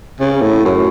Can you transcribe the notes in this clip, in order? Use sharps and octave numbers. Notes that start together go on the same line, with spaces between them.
C#3
A2
F#2